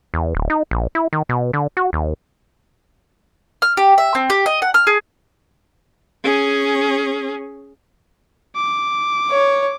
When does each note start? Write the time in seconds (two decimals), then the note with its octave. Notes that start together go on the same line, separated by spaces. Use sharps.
0.14 E2
0.35 D1
0.50 D#4
0.71 A#1
0.95 E4
1.13 D#3
1.29 B2
1.53 D3
1.77 F#4
1.93 D#2
3.62 F6
3.77 G4
3.98 E5
4.15 C4
4.30 G4
4.46 D#5
4.62 F#5
4.74 F6
4.87 G#4
6.24 C#4 G#4
8.56 D6
9.30 C#5